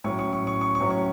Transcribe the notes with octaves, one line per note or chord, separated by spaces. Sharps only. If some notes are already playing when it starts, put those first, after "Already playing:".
A2 F#3 C#4 C#6
C#6
C#6
C#6
C#6
C#6
A2 F#3 C#4
C#6